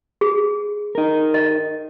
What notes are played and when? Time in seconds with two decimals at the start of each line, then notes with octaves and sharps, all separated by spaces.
0.21 G#4
0.95 D#4 A#4
1.34 D#5